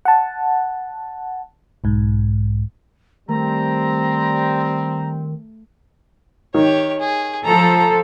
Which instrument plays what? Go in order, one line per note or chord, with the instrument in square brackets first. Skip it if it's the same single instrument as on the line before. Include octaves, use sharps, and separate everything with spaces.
[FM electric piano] F#5 A5
B1 G#2
[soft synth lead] D#3 [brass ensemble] G3 C4 [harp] A3 [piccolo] A#5
[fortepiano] D#3 [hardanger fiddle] G4 C#5
[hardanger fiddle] G#4
[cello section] F3 A4 [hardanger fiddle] A#5